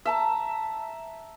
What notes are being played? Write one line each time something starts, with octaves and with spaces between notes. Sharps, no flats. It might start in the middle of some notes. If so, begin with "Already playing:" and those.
E5 A5 A#5